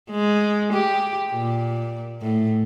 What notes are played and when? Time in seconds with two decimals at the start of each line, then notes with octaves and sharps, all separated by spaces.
0.10 G#3
0.73 G4
1.31 A#2
2.22 A2